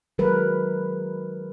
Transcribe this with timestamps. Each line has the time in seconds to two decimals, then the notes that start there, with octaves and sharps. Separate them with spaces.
0.18 D#3 F#3 G#3 A#4 B4